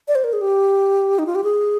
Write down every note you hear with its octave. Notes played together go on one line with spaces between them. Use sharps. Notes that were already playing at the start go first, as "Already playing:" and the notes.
D5
C5
A#4
G#4
G4
D#4
F4
G4
G#4